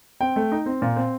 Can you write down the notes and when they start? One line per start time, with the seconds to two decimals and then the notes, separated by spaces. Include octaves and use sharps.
0.20 C4 G5
0.36 A3
0.52 D#4
0.66 C4
0.82 A#2
0.96 C4